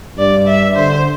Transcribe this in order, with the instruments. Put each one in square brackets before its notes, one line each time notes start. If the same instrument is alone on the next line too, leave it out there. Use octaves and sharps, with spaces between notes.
[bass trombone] G2 [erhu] D5
[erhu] E5
[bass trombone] D3 [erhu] C5